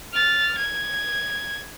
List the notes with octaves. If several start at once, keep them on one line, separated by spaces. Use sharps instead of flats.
F6 A6
G#6